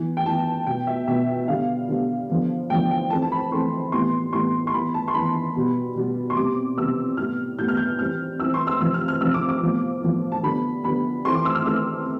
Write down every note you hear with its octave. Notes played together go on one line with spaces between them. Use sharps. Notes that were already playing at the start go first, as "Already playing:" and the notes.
Already playing: E3 B3
G5
E3 B3 A5
B2 B3 G5
E5
B2 B3 E5
D3 G3 B3 F5
D3 G3 B3
D3 F3 B3
D3 F3 B3 G5
G5
E3 A3 C4 A5
A5
B5
E3 A3 C4 C6
A2 E3 G3 B3 C6
A2 E3 G3 B3 C6
C6
E3 B3 B5
A5
C6
E3 B3 B5
B2 G3 B3
B2 G3 B3
C6
C3 G3 B3 D6
C3 G3 B3 E6
A2 G3 B3 F6
A2 G3 B3 G6
F6
G6
E3 G3 C4 F6
E3 G3 C4 E6
C6
E6
C3 F3 C4 E6
F6
F6
C3 F3 C4 E6
D6
D6
A2 F3 B3
A2 F3 B3
A5
D3 G3 B3 B5
D3 G3 B3 B5
E3 A3 C4 C6
D6
E6
F6
E3 A3 C4 E6